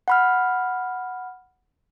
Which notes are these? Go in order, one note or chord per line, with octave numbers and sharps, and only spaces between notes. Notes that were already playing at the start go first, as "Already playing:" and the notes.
F#5 B5 F6